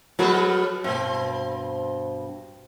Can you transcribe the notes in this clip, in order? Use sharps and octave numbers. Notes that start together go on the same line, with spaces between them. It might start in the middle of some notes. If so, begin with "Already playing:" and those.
F#3 G3 B3 F#4 A4 B4
G2 B2 C4